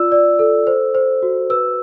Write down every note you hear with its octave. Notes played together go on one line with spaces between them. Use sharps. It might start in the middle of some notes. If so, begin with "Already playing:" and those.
Already playing: F4 D5 E6
D5
A4
C5
C5
F#4
B4 E6